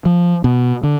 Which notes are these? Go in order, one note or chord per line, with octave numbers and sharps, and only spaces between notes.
F3
B2
D3